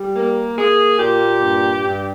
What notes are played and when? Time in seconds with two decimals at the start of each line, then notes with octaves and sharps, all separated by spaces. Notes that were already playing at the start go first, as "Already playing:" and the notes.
Already playing: G3
0.16 A#3
0.58 A#3 G#4
0.99 A#2 G4
1.41 G2
1.83 G2